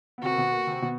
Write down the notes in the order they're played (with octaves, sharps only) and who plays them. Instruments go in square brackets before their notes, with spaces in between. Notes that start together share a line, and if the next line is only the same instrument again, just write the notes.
[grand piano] B3
[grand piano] C3 C4 [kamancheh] F#4
[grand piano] A#3
B2 B3
A#3
C3 C4
B2 B3